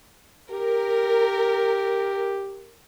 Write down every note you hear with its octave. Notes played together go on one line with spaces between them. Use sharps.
G4 A#4